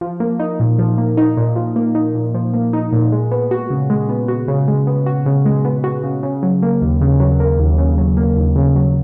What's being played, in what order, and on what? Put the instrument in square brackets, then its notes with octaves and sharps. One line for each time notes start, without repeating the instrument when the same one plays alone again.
[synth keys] F3
A#3
D#4
A#2
F3
A#3
D#4
A#2
F3
A#3
D#4
A#2
F3
A#3
D#4
A#2
G#3
B3
F#4
C#3
G#3
B3
F#4
C#3
G#3
B3
F#4
C#3
G#3
B3
F#4
C#3
C#3
F#3
A#3
D#2
C#3
F#3
A#3
D#2
C#3
F#3
A#3
D#2
C#3
F#3